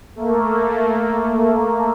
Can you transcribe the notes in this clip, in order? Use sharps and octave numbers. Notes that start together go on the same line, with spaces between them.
A3 A#3